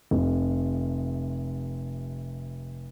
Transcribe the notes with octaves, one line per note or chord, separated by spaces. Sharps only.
F1 C3